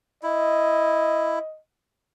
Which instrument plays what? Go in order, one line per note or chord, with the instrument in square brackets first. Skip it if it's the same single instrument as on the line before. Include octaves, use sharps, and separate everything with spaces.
[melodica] E4 [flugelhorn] D#5